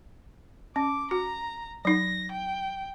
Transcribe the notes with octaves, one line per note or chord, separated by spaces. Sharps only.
C#4 D6
F#4 A#5
F#3 D#4 A#6
G5